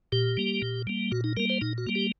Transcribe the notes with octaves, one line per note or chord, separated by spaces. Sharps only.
A#2 G4
G3 A#3
A#2
G3 A#3
A#2 F#4
D#4
G3 A#3 A#4
C5
A#2 D#4
F#4
G3 A#3
G4